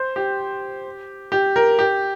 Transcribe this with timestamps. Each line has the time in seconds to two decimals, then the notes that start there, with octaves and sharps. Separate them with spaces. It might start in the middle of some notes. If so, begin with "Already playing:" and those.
Already playing: C5
0.16 G4
1.32 G4
1.56 A#4
1.79 G4